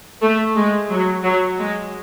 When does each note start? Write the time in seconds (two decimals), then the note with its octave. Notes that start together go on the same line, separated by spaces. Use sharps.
0.22 A3
0.56 G#3
0.90 F#3
1.24 F#3
1.58 G#3